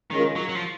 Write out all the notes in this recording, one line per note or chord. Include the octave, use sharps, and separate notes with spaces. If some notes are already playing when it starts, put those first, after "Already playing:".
D#3 G#3 C#4 F4 A#4
F#3
F#3
F3